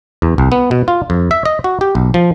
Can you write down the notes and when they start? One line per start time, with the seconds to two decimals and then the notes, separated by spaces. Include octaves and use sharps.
0.22 E2
0.38 C2
0.52 B3
0.71 B2
0.88 F4
1.10 F2
1.31 E5
1.45 D#5
1.64 F#4
1.81 G4
1.95 B1
2.14 F3